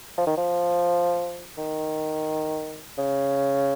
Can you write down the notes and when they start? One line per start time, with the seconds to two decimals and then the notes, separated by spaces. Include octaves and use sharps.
0.18 F3
0.27 D#3
0.37 F3
1.58 D#3
2.98 C#3